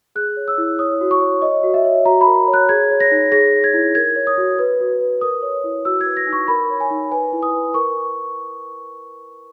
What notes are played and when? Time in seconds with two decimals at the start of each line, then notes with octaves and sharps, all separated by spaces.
0.15 G#4 F#6
0.37 C#5
0.48 E6
0.58 E4
0.79 C#5 D#6
1.01 F#4
1.11 C#6
1.21 C#5
1.42 C#5 D#5
1.63 F#4
1.74 E5
1.85 C#5
2.05 F#4 A#5
2.21 B5
2.27 A#4
2.48 C#5
2.54 F#6
2.69 G#4 G#6
2.91 C#5
3.00 A#6
3.11 D#4
3.32 G#4 A#6
3.53 C#5
3.64 G#6
3.74 E4
3.95 A#4 G#6
4.16 C#5
4.27 D#6
4.37 F#4
4.59 B4
4.80 F#4
5.00 B4
5.21 A#4 D#6
5.42 C#5
5.64 E4
5.85 F#4 E6
6.01 G#6
6.06 B4
6.17 A#6
6.27 D#4
6.33 C#6
6.48 A#4 B5
6.70 C#5
6.80 G#5
6.91 D#4
7.11 B4 G#5
7.33 E4
7.43 D#6
7.54 B4
7.74 A#4 C#6